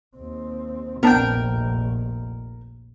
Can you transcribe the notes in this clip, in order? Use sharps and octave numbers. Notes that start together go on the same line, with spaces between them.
D#2 C4
F1 A#1 B3 C4 D4 A#4 G5